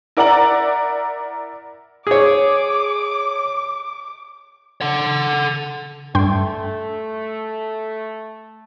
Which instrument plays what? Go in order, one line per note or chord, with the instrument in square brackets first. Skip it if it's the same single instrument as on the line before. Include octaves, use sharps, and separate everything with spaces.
[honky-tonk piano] E4 A#4 D5 F#5 A#5 F#7
[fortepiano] G#4 C#5 [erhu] D6
[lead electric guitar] A4 F#5
[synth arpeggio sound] G2 G5 C6 [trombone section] A3